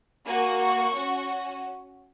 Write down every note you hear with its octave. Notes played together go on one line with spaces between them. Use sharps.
A#3 F#4 G#5
C#6
C#4 F#4